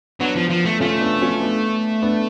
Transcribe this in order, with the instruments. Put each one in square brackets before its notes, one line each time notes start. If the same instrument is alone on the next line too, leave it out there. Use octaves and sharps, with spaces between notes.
[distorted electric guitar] F#3 [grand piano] B3 D4
[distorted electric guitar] F3
F3
A3
[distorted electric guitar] A3 [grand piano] C#4 F4
[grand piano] B3 D4
C#4 F4
B3 D4
B3 D4